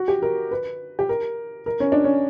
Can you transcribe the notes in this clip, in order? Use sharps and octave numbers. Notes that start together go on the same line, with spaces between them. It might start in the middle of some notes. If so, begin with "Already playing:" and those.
Already playing: F#4
G4
A#4
B4
G4
A#4
A#4
C#4
D4
C#4